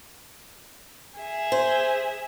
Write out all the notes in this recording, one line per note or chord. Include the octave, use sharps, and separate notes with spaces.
G#4 E5
C5